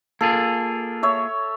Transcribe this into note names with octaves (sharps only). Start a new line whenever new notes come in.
A#3 F4 G#4 A4
C#5 E5